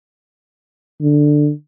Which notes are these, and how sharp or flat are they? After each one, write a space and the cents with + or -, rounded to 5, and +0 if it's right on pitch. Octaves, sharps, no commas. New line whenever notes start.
D3 +10